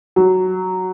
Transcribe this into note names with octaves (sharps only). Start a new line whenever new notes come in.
F#3